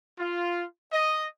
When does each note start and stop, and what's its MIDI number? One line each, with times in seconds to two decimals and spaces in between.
0.19 0.64 65
0.92 1.27 75